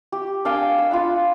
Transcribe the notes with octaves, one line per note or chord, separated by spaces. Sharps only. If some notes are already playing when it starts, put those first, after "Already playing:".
G4
D4 F5 G5 G#5
E6
F4 F5 F#5 B5